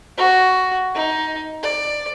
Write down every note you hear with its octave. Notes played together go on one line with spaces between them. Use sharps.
F#4
D#4
D5